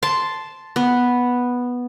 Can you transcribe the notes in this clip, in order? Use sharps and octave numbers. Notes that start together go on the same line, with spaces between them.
A5 C6
B3